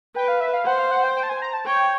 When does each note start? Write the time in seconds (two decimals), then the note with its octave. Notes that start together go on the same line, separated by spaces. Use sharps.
0.16 B4 G5
0.28 F5
0.41 E5
0.53 F5
0.66 C5 F#5
0.78 F5
0.91 F#5
1.03 G5
1.16 G5
1.23 A5
1.29 G#5
1.42 A#5
1.53 A5
1.66 C#5 G5